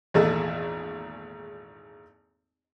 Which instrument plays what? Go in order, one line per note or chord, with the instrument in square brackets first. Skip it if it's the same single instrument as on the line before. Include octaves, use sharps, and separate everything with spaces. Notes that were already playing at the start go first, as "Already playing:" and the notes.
[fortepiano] G#1 E2 A#2 A3 A4 D#5